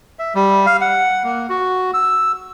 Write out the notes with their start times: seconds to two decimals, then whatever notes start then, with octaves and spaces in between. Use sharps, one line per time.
0.19 E5
0.35 G3
0.66 F5
0.81 F#5
1.24 A#3
1.49 F#4
1.94 E6